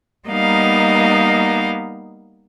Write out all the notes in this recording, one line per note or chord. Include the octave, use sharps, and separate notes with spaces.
G3 A#3 B3 D#4 D#5 F5